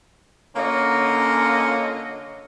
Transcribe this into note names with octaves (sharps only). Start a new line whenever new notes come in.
D3 A#3 C#4 F4 C#5 D#5